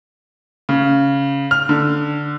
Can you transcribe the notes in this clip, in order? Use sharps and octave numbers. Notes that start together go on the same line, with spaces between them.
C#3
F6
D3